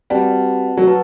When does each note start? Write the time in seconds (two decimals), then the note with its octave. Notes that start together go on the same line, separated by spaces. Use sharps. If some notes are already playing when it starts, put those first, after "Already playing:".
0.10 G3 C4 F#4 B4 F#5 A5
0.77 F#3
0.87 B4 F#5 A5